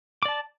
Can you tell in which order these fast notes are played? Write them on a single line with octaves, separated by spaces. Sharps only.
D6 D5 A5